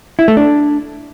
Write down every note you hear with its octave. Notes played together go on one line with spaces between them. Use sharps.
E4
A3
D4